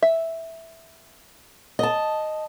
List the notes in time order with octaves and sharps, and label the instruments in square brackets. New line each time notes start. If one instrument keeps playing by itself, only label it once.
[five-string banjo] E5
[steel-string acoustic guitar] D#5 A5